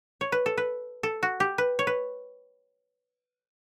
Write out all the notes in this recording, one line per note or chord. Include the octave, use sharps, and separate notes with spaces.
C#5
B4
A4
B4
A4
F#4
G4
B4
C#5
B4